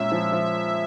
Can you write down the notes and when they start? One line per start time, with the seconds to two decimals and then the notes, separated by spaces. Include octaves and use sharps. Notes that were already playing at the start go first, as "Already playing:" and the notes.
Already playing: A#2 G#3 C#4 E5
0.12 F3
0.32 F3